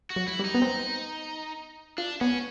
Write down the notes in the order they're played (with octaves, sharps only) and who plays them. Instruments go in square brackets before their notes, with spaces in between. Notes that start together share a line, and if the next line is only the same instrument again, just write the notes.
[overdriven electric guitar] F#4
[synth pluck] F#3
[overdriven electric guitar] E4
[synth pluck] G3 [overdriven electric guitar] D#4
[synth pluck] B3
C4
[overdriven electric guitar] D4 [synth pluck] F4
[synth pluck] B3 [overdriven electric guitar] C#4